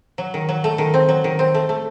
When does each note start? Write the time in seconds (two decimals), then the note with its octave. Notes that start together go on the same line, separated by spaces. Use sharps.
0.18 F#3
0.34 D#3
0.49 F#3
0.64 A3
0.78 D#3
0.94 C4
1.09 F#3
1.24 D#3
1.39 C4
1.54 A3
1.69 A3